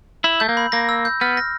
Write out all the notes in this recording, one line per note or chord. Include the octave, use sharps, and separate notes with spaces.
E4 E6
A3 G6
A#3
B5
A#3 A#6
E6
G6
B3 F6
A#6